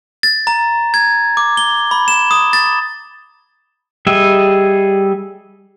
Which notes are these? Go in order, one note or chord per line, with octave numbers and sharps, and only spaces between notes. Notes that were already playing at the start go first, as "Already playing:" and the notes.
A6
A#5
G#6
D6
G7
B5
E7
D#6
A6
G3 G#4 D#5 E5